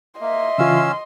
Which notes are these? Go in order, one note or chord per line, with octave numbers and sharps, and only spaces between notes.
A#3 D#5 E5 C6
C#3 E3 C#4 F4 F5 E6